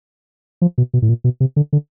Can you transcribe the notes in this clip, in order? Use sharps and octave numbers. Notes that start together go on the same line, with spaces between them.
F3
B2
B2
A2
A#2
B2
C3
D3
D3